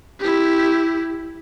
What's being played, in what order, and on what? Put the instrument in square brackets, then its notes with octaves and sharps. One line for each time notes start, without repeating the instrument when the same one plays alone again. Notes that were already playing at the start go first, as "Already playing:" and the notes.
[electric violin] E4 G4